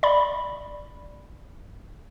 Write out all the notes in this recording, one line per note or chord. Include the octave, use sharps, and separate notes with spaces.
D5 B5